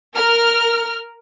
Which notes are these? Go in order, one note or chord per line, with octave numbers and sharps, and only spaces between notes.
A#4 F6